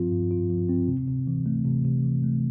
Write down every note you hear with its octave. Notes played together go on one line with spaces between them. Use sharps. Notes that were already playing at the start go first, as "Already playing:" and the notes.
Already playing: G2 F3 C4 F4
G2
F4
F3
C4
C3
C3
E3
A3
C3
C3
E3
A3